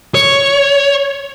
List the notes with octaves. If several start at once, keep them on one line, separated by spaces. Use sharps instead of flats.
C#5